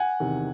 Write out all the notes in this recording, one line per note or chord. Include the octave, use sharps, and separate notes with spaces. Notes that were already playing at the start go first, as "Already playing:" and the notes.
Already playing: F#5 G#5
E2 C3 D#3